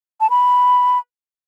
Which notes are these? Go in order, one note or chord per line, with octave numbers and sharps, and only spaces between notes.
A5
B5